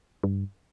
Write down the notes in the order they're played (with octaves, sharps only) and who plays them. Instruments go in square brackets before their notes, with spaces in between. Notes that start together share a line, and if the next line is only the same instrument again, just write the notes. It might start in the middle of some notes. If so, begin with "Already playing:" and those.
[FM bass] G2